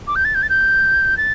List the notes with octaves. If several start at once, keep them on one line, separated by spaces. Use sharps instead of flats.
D6
G6
A6
G6
A6
G6
A6